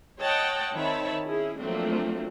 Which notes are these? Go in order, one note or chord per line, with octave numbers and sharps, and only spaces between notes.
C#5 D#5 F#5 G5 A5
D#3 C4 C#5 E5 A5 B5
C#4 E4 G#4
F3 F#3 A3 A#3 C4 D4